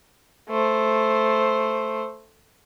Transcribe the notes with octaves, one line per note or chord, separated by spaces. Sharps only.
A3 C5